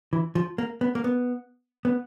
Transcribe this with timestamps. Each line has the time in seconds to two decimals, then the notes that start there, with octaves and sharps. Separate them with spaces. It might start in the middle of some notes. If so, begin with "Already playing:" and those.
0.13 E3
0.35 F3
0.58 A#3
0.81 B3
0.95 A#3
1.04 B3
1.85 B3